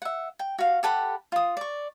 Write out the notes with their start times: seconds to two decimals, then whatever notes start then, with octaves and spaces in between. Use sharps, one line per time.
0.02 E5 F#5
0.39 G5
0.59 F#4 F5
0.83 G4 A4 F#5 B5
1.32 F4 D#6
1.57 D5 C#6